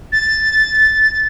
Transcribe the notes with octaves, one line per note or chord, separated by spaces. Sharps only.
A6